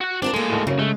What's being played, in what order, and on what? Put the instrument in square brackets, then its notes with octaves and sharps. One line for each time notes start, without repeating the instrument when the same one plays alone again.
[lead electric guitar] F#4 F#5
[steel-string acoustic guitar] C4 F4 A#4 [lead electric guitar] D4
[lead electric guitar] A#2 G#3 [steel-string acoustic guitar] A#3 A4
[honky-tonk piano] D#2 A2
[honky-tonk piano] F#2 A#3 C#4 [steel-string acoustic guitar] C#3
[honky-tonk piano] G#3 [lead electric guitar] A3